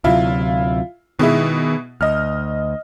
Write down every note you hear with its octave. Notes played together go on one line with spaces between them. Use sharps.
D2 C3 F#3 E4 F4
B2 D#3 G#3 E4
D2 D#5 F6